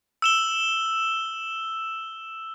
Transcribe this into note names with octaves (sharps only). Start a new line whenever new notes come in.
E6 E7 G7